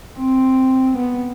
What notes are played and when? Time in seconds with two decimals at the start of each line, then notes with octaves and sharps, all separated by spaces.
0.19 C4
0.98 B3